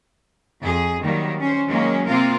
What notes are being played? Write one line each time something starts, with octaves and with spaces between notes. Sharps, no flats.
F2 G#4
D#3 F#3 G3 A#3
C#4 C5
D#3 F#3 G#3 A#3 C#4
C3 A#3 C4 F4 A#4 F5